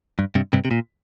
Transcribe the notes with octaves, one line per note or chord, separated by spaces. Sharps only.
G2
G2 C3
G2 C3
C3
A#2